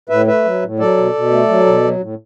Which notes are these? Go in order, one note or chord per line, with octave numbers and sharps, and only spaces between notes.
A2 B4 E5
A3 B4 E5
F#3
A2
F#3 A4 D5
B2
B2
A3
F#3
B2
F#3
A2